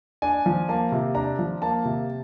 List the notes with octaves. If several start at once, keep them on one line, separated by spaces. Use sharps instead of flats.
D4 G#5
F3
A#3 A5
C3
D4 A#5
F3
A#3 A5
C3